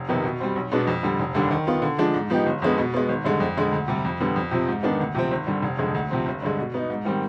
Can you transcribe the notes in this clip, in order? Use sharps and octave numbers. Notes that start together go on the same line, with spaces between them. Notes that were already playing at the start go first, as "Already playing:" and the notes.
Already playing: F1
F2 C3 D#3 B3
B2
G3 C4
B1
B2 G#3 B3 D4
F2
D3 G3
F1
D#2 D3 G3 D4
D#3
B3 F4
D3
F3 G#3 D4
G#2
F3 B3 D#4 G4
G1
F2 D3 G#3 B3
B2
G#3 B3
G#1
G2 D3 G#3
F2
D3 G#3
D2
C3 G3
F2
D3 G3 B3
F2
C3 F3 C4
G#2
D#3 B3 D4
D2
C3 F3 C4
G#1
G2 D3 G3
F1
F2 D3 G#3
D2
C3 F3 C4
G1
G2 D3 G#3
B2
B3 D#4
G#2
D#3 G3 C4